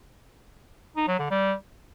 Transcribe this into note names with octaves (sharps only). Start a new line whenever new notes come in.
D#4
F#3
D3
G3